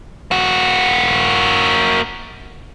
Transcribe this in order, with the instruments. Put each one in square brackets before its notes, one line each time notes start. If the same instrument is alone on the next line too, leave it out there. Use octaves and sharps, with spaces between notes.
[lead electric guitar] A#3 F#4